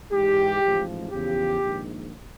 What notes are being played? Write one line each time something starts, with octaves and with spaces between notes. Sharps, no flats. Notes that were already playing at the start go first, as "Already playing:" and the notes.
G#2 E3 G#3 G4
A1 G#2 F3
E2 C#3 F3 G4
A#1 G#2 D#3